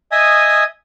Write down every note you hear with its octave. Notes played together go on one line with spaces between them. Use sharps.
D#5 E5 G#5 D#6